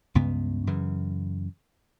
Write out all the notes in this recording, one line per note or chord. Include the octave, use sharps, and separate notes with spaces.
C#2 G2 C#3 B3
F#2 C#3 E3